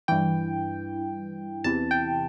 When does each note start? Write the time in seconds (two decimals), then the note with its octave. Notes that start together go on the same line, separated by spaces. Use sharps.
0.08 G2 E3 G5
1.64 E2 C3 E3 A5
1.91 G5